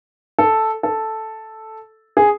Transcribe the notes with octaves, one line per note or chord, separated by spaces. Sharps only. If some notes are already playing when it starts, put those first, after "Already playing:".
A4
A4
G#4